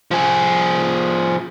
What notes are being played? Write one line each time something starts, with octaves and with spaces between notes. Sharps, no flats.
F3 G#4